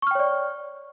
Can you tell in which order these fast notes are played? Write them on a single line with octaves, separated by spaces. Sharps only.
C#6 F6 G5 C#5 D5